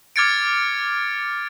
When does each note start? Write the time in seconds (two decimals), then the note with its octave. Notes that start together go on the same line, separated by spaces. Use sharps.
0.16 D6 F6 G#6 A6 C#7 D7